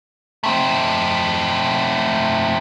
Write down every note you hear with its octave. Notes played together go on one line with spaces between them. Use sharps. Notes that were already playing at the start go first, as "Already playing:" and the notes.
A3 C4